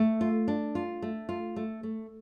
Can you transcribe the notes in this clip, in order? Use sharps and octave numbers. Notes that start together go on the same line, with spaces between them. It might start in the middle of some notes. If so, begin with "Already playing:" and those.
Already playing: A3
F4
D4
F4
A3
F4
A3
A3